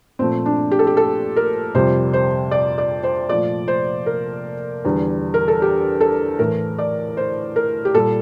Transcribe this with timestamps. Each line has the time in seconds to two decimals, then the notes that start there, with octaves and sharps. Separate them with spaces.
0.19 A#2 F3 A3 C4
0.46 D4
0.71 G4
0.79 A4
0.87 G4
0.97 A4
1.36 A#4
1.74 F2 C3 G3 C5
2.13 C5
2.51 D5
2.78 D5
3.03 C5
3.29 A#2 F3 A3 D5
3.68 C5
4.06 A#4
4.85 E2 D3 G3
5.34 A#4
5.48 A4
5.62 G4
6.01 A4
6.39 A2 E3 A3 A#4
6.79 D5
7.17 C5
7.56 A#4
7.85 G4
7.94 A#2 G3 A4